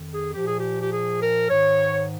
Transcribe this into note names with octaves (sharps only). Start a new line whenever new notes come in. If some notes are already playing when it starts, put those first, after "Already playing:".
Already playing: F2 D#3
G#4
A#2 F3 G4
G#4
G4
G4
G#4
A#4
G#2 D#3 C#5